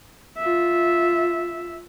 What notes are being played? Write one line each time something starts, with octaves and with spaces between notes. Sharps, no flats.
F4 E5